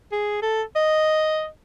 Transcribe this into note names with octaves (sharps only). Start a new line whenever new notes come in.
G#4
A4
D#5